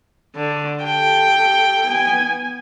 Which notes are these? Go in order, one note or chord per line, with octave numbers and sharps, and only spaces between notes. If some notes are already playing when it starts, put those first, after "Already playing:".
D3
G4 A4 G5
B3 G#5